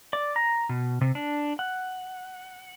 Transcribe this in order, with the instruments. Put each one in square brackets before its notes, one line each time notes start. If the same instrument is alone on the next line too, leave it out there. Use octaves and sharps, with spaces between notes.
[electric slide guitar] D5
A#5
B2
C3
D4
F#5